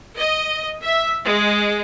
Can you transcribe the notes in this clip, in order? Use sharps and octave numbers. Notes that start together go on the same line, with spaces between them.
D#5
E5
G#3